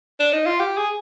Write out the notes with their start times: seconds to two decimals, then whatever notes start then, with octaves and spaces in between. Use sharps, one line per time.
0.20 D4
0.33 D#4
0.46 F4
0.60 G4
0.77 G#4